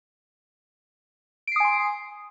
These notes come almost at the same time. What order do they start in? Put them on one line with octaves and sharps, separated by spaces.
D7 C7 D#6 G#5 C6